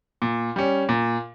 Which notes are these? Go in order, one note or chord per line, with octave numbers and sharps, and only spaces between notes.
A#2
G3 C#4
A#2